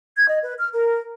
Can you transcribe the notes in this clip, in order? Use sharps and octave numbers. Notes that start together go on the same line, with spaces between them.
G#6
D#5
B4
F6
A#4